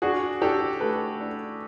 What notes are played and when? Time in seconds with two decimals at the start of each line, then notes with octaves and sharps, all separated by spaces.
0.02 D4 F#4 G#4
0.42 D4 G4 A4
0.80 A3 A4 B4
1.20 D4